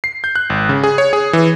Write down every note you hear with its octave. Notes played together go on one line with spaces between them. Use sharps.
C7
G6
F#6
G#1
C#3
G#4
C#5
G#4
E3